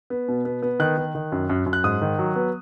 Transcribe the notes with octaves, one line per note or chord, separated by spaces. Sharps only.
B3
B2
B3
B3
D#3 F#6
D#3
D#3
F#2
F#2
F#2
F#6
G#2 D#6
D#3
F#3
B3